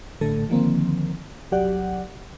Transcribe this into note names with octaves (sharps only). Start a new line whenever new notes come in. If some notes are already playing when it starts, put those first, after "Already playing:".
A#1 A2 D3 A3 A4
D3 D#3 F3 A#3 C4
G1 C2 F#3 G4 D5 F#5